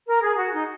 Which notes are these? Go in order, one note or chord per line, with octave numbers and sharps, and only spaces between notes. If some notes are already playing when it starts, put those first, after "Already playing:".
A#4
G#4
F#4
D#4